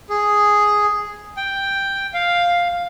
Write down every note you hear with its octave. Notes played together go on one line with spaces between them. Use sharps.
G#4
G5
F5